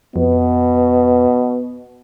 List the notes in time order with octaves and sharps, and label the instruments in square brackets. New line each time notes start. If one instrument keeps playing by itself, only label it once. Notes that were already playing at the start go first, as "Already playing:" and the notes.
[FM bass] F2 [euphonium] B2 [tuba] B3